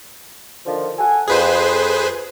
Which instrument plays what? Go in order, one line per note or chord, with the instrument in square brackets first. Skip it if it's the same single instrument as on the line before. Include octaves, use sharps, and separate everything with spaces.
[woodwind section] D3 D#3 F3
A4 F#5 G#5
[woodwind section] F2 [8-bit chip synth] G#4 B4 C5